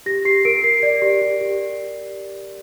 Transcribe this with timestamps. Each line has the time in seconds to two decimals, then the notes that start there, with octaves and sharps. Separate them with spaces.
0.06 G4 A#6
0.25 G4 C7
0.45 A#4 D7
0.64 A#4 C7
0.83 D5
1.02 G4
1.21 G4
1.41 G4